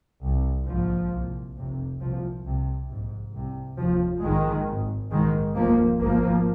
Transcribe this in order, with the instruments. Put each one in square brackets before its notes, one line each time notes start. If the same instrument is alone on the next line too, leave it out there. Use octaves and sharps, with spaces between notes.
[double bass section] C2 C3
A#1 G#2 F3
C2 A#2
F1 F2 C3
C2 A#2 F3
C2 C3
A#1 G#2
C2 C3
F1 D#2 F3
A#1 G#2 D#3 G#3
G#1 G#2
A#1 G#2 D#3 G#3
F1 D#2 F3 A#3
G#1 G#2 F3 A#3